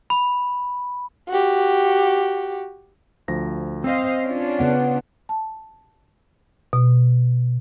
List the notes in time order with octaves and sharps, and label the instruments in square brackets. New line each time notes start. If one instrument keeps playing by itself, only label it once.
[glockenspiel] B5
[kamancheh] F#4 G4
[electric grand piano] D2 F3 A#6
[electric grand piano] C4 [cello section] C5 D#5 F5
[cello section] C#4 D4 F4
[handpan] C#3 B3 F#5
[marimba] A5
B2